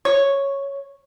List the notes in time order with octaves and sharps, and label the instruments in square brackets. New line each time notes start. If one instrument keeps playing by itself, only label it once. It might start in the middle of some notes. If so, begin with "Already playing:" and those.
[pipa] C#5